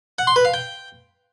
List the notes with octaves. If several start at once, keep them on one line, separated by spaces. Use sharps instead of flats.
F#5
C6
B4
F5
G5